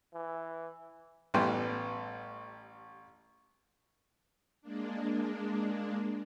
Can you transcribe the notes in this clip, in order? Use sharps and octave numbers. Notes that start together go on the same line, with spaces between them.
E3
A1 A2 G3 B3 G5 C6
G#3 A#3 D4